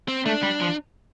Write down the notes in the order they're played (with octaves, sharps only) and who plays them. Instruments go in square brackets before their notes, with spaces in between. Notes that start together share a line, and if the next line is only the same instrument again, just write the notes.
[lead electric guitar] C4
[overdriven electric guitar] A3 [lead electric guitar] D4
[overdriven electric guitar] G3
F3